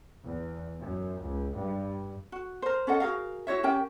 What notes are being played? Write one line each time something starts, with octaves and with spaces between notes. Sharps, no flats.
E2
F#2
C#2
G2
F#4
A#4 C5
C#4 A4 D#5 F#5
F#4 G#4 A#4 F5
E4 F#4 C#5 E5
C#4 G4 A#4 G5